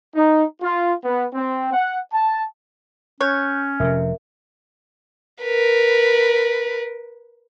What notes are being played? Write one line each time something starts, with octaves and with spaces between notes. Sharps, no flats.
D#4
F4
B3
C4
F#5
A5
C#4 C#5 F#6 G6
F1 A2 C3 A#4 E5
A#4 B4